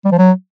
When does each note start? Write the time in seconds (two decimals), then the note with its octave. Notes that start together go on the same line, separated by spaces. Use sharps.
0.05 G3
0.12 F3
0.18 F#3